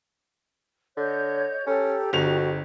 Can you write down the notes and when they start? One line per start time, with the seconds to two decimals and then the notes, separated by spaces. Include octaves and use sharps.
0.97 D3 C#5 D#5 G6
1.67 C#4 G4 A4 A#5
2.13 G1 F2 F#4 F7